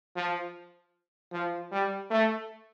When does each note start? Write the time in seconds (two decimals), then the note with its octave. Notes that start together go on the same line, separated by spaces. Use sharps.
0.16 F3
1.33 F3
1.72 G3
2.11 A3